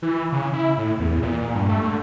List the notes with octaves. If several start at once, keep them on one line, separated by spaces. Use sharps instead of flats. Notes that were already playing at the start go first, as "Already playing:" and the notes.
E3
C#3
E4
A2
E2
A#2
G2
A3
D3